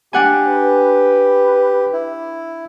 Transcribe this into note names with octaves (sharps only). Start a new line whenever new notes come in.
D4 G4 F#5 G#5
B4
E4